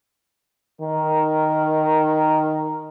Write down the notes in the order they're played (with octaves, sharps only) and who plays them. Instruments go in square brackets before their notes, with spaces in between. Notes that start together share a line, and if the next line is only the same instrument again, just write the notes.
[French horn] D#3 [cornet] A#4